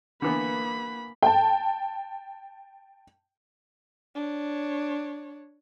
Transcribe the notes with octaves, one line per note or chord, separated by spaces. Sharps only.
D3 E3 A#3 B3 B5
G5 A5
D4 C#5